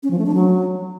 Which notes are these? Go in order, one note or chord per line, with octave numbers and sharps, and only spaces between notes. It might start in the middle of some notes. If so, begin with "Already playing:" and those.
C#4
F3
A3
D4
F#3